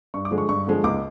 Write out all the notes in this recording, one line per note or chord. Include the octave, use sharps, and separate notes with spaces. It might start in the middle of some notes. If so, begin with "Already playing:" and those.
G2 C#6
D6
D3 F3 G#3
C#6
G2 C#6
D3 F3 G#3
C#2 D6